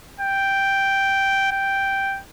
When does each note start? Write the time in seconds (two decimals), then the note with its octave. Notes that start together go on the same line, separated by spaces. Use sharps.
0.20 G5
1.52 G5